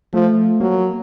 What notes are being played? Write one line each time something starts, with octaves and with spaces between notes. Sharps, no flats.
F3 A3
F#3 A#3